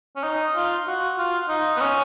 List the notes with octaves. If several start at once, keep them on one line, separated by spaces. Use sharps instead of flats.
C#4
D#4
F4
F#4
F4
D#4
B3
C#4